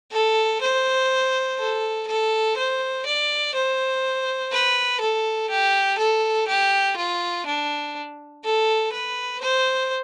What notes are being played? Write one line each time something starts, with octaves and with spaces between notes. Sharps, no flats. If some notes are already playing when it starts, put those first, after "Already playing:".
A4
C5
A4
A4
C5
D5
C5
B4
A4
G4
A4
G4
F4
D4
A4
B4
C5